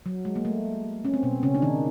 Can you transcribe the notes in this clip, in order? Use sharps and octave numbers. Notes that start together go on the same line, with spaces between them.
F#3
G#3
A#3
A3
C#4
C4
B2 B3
C#3 C#4
D4
D#3 D#4